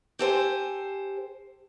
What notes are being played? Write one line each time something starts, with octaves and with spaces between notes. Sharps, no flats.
G4 A4 C5 G#5